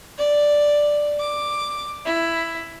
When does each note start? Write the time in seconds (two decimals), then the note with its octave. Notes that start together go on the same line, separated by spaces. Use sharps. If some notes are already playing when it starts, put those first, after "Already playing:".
0.18 D5
1.20 D6
2.06 E4